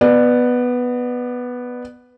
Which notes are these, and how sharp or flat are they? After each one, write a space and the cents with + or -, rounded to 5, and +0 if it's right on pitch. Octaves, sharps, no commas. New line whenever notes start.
B3 +0 D5 +30